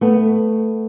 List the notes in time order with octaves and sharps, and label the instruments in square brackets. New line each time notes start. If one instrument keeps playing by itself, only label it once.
[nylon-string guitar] A3 B3